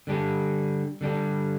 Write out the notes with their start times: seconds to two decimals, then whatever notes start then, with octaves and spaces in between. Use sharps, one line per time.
0.07 D3 G3 D4 G4
1.01 D3 G3 D4 G4